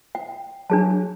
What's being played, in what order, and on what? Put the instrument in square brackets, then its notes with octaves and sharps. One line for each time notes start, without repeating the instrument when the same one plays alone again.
[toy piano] G5
[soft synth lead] F#3 [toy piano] D4 G#4 A5